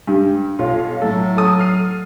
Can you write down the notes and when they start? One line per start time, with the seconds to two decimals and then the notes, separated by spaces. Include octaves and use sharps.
0.07 G2 G3
0.59 B1 F4 C#5 F5
1.01 A2 F#3 A3 A4
1.37 A4 D#6
1.59 F6 C7 D#7